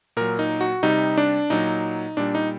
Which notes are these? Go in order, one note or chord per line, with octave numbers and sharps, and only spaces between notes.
A#2 F#3 A#4
D#4
F#4
C3 G3 D#4
D4
A#2 F#3 D#4
A#2 G3 D4
D#4